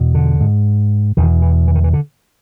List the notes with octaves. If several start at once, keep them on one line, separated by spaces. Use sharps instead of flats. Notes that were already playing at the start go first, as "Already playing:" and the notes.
Already playing: E2 B2
D3
G#2
E2 B2 D#3
E3
E3
D#3
E3
D3